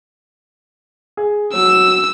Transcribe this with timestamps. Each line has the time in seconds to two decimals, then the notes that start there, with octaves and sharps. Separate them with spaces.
1.17 G#4
1.53 F#3 E6